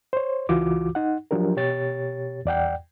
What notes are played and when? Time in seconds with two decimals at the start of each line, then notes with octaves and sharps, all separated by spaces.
0.13 C5 C#5
0.49 C#2 E3 F4 F#4 D6
0.95 D#4 F#5
1.31 F3 F#3 D4 G4 A#4
1.56 B2 G4 C#5 A6
2.45 E2 D5 F#5 G5